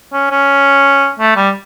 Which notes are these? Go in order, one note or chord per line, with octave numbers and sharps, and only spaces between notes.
C#4
C#4
A3
G3